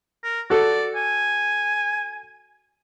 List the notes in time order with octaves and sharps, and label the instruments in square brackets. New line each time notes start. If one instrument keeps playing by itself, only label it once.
[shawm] A#4
[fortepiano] F#4 A4 [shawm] D5
[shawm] G#5